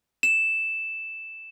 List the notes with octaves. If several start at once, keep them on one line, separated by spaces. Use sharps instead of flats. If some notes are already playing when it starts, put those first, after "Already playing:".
E7